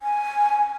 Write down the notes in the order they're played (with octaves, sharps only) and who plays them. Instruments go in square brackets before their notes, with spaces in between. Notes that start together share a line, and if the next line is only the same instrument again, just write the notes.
[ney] G#5